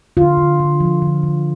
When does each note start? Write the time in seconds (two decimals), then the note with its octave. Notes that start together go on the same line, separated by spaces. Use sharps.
0.17 D3 F4
0.38 D3
0.60 D3
0.80 F3
1.02 D3
1.23 D3